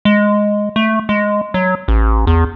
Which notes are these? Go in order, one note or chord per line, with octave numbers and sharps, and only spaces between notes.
G#3
A3
G#3
F#3
A1
E2